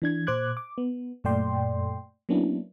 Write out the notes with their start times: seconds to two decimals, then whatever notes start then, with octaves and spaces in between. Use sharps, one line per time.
0.02 E3 D4 G#6
0.27 A#2 C5 D6 F#6 G#6
0.57 D6
0.78 B3
1.24 F#2 A#2 A3 D5 G5 C6
2.29 F#3 A#3 B3 C#4 D4 E4